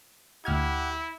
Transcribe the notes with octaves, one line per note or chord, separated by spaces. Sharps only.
D2 E4 G4 F#5 F6 G#6